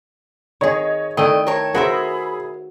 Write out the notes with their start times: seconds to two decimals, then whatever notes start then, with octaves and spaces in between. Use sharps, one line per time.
0.61 D#3 G#4 C#5 D#5
1.17 D#3 A3 E4 D5 D#5 G5
1.47 A#4 C#5 A5
1.75 F#4 G#4 A#4 C5 E5 B5